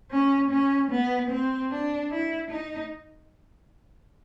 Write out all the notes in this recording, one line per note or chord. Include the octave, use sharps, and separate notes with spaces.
C#4
C#4
B3
C4
D4
E4
D#4